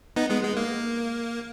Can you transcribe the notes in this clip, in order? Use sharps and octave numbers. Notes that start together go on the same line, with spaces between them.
B3 D#4
G#3 B3
G#3
A#3